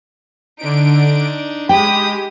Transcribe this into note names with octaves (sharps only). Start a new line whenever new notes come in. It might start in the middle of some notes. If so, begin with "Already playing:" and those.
D3 D4 D#4 D7
G#3 G4 G5 B5 D#6